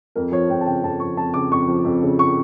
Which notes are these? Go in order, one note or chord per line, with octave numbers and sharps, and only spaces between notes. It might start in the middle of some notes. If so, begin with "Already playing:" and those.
F2 A#4
F3 C#5
F2 G5
A5
C#3 G5
F2 A5
F3 C#6
F2 A5
C#3 D6
F2 C#6
F3
F2
C#3
C#6